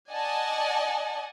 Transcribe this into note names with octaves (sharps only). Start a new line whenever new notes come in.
D5 D#5 F#5 G#5 A5